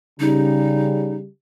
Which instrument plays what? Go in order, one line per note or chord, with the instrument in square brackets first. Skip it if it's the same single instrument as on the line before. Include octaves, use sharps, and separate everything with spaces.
[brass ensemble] C#3 G3 [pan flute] D#4